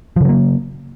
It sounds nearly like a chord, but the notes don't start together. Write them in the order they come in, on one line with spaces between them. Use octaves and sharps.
F3 C#3 F#3 A#3